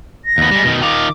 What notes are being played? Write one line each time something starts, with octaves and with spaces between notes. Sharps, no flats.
A#6
D#2 B3
G3 G#3
B2 D#3
D#3 F4 D6